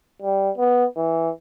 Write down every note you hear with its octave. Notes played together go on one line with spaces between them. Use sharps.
G3
B3
E3